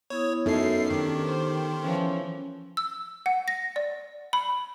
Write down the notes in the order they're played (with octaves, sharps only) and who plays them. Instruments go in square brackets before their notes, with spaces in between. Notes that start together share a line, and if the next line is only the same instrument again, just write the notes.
[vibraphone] B3 E4 D#6 [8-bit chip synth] C#5
[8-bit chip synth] F#2 C7 [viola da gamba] F#3 [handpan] B3 D#4 A4 [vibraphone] F#4 E5
[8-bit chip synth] D#3 [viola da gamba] C#4 D4 [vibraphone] G4 D6
[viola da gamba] C5
[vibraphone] G5 C6
[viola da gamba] E3 F3 [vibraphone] C#4 C#5
[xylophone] E6
F#5
A#6
D5
B5